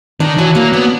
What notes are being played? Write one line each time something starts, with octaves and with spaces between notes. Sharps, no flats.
D#3 D4
E3 F#3
F#3 A#3
B3 D4